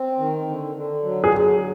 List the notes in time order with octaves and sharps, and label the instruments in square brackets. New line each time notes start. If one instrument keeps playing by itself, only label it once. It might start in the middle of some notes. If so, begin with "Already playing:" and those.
Already playing: [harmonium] C4
D#3
D3
D3
F#3
[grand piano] G#4